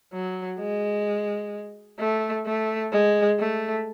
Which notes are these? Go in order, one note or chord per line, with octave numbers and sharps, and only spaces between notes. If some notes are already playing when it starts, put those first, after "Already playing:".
F#3
G#3
A3
A3
G#3
A3